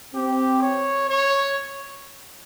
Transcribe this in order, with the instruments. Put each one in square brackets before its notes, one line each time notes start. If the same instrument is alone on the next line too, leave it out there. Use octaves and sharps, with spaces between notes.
[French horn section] C4 [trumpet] G4
[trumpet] C#5
C#5